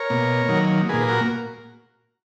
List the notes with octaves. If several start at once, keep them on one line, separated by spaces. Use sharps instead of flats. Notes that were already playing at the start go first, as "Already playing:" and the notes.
Already playing: A#4 C#5
B2 A#3
D#3 F#3 A#3
A#2 A#3 G#4 B4
B4
F#4 A#4